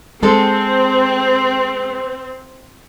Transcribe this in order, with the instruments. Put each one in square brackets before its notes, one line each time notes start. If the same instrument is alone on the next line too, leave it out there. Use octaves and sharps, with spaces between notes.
[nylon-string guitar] G#3 A4 [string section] C4